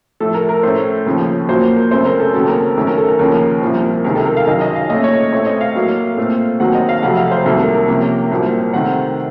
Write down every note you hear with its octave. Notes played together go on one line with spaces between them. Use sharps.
A2 F3 A3 A4
A#4
A#4
A2 A3 C#4 C5
D#2 C#3 F3
A#2 F#3 A#3 C5
A#4
F#2 C#3 A3 C4 C5
A#4
A4
D#2 C#3 F#3 C4 A4
A#4
F#2 D#3 A3 C#4
A#4
A4
A#4
D#2 C#3 F3 A#4
C2 A#2 F3 C4
C#2 C3 D#3 A#4
A4
A#4
F5
F#2 D#3 F#3 D#5
D#5
F5
A#2 A3 C#4 D#5
C#5
A2 A3 C4 C#5
D#5
F5
A2 F#3 A#3
A#2 A3 C4
D#2 D#3 F#3 C4 F#5
D#5
F5
F2 C3 F#3 A3 F#5
F5
C5
C2 C3 D#3 F#3 A#3 A4
A#4
A#4
C3 F3 A#3 C#4
C2 A#2 F#3 C4
C3 D#3 A3 C4 F#5